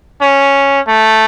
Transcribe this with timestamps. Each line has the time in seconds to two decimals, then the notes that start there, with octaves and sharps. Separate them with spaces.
0.21 C#4
0.88 A3